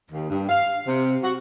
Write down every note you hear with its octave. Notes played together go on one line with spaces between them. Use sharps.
D#2
G2
F5
C3
F#4